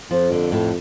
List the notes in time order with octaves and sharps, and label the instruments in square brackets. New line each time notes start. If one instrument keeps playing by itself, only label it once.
[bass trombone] F2 [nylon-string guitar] F3
[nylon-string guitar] D3
A2